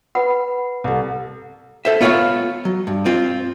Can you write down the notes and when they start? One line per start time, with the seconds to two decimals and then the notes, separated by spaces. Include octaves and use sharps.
0.15 B4 F#5 B5
0.84 C2 A4
1.85 A4 C5 E5
2.01 B3 F4 C#5 D5 E5 F5
2.65 F#3
2.87 G2
3.06 C4 F4